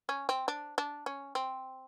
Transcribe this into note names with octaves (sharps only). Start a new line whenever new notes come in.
C#4
C4
D4
D4
C#4
C4